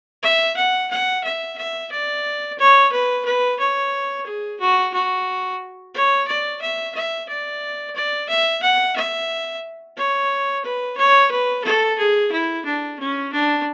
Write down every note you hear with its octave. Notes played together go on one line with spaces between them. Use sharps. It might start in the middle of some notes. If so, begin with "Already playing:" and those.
E5
F#5
F#5
E5
E5
D5
C#5
B4
B4
C#5
G#4
F#4
F#4
C#5
D5
E5
E5
D5
D5
E5
F#5
E5
C#5
B4
C#5
B4
A4
G#4
E4
D4
C#4
D4